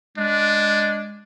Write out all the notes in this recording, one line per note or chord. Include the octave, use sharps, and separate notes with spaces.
G#3 D4